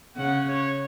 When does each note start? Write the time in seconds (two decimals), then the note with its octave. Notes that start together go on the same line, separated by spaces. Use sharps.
0.17 C#3 F#5
0.49 C#5